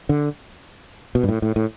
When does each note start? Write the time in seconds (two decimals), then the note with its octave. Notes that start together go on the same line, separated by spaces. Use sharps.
0.09 D3
1.15 B2
1.23 G2
1.29 A2
1.42 A2
1.56 A2